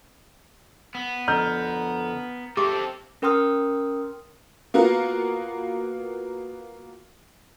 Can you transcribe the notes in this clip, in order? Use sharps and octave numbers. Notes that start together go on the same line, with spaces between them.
B3
F2 D3 A#5 F6 G6
C4 G4 A4 E5 D6
C#4 A#4 G5 C6 D#6 F6
A#3 B3 F4 F#4 A#4